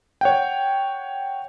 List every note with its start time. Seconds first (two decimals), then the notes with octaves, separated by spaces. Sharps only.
0.21 C#5 F#5 G5